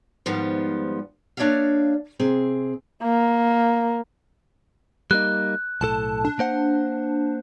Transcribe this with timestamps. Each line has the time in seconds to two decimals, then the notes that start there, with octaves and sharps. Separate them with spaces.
0.26 G#2 D#3 F3 G3 B3 F4
1.37 A#3 D4 C#5 D5 E5 F5
2.19 C3 C4 G#4
3.03 A#3
5.11 G3 A#3 D#4 F#6
5.81 B1 A2 A4 A5
6.25 D4
6.39 A#3 C5 F#5